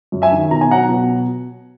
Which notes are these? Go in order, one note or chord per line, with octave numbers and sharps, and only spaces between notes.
F#2
E5 G#5
D#3
B2 A#5
G#5
F#3 F#5 A#5
B2